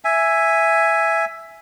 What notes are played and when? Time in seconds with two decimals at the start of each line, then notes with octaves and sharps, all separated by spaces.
0.05 E5 G#5